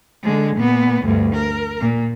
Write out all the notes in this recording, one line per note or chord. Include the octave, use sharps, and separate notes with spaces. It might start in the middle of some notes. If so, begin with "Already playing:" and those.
D3 G#3
A#2 B3
D2 G2
A#4
A#2